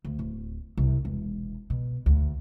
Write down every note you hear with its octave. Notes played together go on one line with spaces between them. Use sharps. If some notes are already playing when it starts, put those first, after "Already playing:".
D2
D1
C2
E1
B2
D2